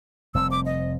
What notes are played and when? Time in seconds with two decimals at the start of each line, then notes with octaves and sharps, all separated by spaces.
0.34 F1 G3 C4 E6
0.51 D6
0.66 D#5